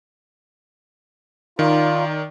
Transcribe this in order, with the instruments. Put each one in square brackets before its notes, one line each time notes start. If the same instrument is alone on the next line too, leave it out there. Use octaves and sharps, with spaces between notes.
[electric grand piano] D#3 [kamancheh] D#4 D5 [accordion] F4